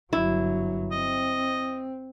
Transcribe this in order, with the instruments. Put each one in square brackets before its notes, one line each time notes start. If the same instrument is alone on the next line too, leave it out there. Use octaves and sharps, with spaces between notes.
[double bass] G1 F#3 [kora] E4
[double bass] C4 [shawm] D#5